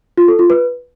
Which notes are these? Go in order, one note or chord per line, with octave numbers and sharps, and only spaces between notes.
F4
A4
F4
B4